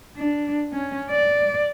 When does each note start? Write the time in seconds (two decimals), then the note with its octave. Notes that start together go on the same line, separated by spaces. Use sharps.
0.17 D4
0.73 C#4
1.11 D5